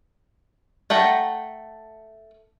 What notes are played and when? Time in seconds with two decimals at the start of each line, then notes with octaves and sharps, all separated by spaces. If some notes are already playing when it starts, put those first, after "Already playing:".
0.90 A3 F#5 G5 A#5